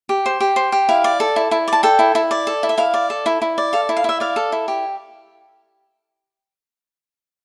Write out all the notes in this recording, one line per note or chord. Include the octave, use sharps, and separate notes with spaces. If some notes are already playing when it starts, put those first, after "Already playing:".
G4
C5
G4
C5
G4
E4 F5
D5
A4
E4
E4
D5 A5
A4 G5
E4
E4
D5
A4
E4
E5
E4 F5
D5
A4
E4
E4
D5
A4 F5
E4
F5
E4 E5
D5 F5
A4
E4
G4